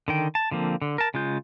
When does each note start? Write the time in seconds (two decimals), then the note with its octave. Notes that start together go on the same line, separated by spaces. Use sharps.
0.08 D3 D#3 G5
0.35 A5
0.51 D3 F3 A#3 C4
0.82 D3
0.98 A#4 A5
1.14 C#3 G#3 F4 G6